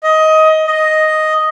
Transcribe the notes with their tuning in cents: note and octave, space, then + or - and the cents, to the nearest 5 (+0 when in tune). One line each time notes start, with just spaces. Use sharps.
D#5 +15
D#5 +0